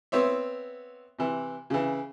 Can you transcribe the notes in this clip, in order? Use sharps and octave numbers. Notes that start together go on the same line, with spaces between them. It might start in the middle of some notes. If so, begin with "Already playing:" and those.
B3 C4 C#5 E5
C3 E3
C#3 E3